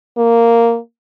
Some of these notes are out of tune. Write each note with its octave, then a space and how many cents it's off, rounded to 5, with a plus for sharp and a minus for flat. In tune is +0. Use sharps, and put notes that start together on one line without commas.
A#3 -5